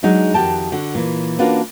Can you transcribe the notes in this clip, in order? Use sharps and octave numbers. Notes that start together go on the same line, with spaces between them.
F#3 G#3 D4 D#4 F#4 G#4
F2 D#3 F#4 G4 G5 A5
D3 F#4
A#2 E3
A#3 C#4 D4 F4 F#4 B4